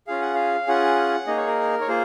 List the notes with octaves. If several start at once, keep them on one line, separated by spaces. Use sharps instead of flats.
C#4 F4 G#4 F5
F#5
F5
C#4 F4 G#4 F#5
A#3 D#4 G#4 D#5
C#5
A#4
C#5
A#3 F4 G#4 C5